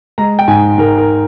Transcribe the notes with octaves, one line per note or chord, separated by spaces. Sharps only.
G#3 A#5
G5
G#2 G#5
G#2 A#4
A#4